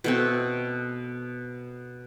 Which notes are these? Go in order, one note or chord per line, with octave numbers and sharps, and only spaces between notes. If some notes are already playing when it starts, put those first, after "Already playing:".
B2 A3 C4